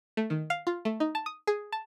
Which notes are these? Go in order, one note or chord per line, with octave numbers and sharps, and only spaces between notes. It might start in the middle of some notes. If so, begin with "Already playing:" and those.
A3
D#3
F5
F4
A3
D#4
A5
D#6
G#4
A5